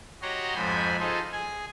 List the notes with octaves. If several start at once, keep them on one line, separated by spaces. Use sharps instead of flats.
F#4 G4 C#5 D#5 A#5 C6
F2 G#2 C5 G#5 B5
D#4 F4 G#4 A4 C5 D#5
G#4 G#5